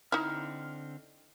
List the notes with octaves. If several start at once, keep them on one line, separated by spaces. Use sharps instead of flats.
D3 C4 D#4 E4 F6